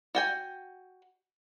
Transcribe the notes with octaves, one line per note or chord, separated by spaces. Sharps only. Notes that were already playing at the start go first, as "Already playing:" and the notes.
F#4 G5 G#5